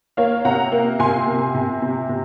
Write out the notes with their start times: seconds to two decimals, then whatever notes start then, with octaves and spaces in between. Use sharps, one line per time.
0.17 A#3 C#5 F5
0.45 C3 F#5 A#5
0.72 A#3
0.99 C3 G#5 C6
1.27 C3
1.54 C3
1.82 C3
2.09 C3